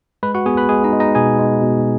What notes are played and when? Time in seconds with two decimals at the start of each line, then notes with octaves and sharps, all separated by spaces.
0.23 G#3 B4 B5
0.35 F#4 F#5
0.46 B3 G#4 G#5
0.57 B4 B5
0.69 G#3 G#4 G#5
0.84 D#4 D#5
0.92 G#3
1.00 D#4 D#5
1.15 B2 G#4 G#5
1.39 G#3
1.62 B2